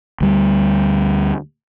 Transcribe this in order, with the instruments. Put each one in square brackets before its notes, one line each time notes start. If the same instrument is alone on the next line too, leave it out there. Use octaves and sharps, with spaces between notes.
[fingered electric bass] D2 G3